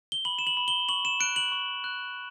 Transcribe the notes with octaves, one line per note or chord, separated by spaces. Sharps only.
G7
B5 F#7
E7
F#7
B5
G7
C#6 F#7
E7
F#6 D7
F#7
C#6
F#6